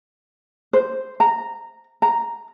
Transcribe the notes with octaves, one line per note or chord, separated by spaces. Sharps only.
C5
A#5
A#5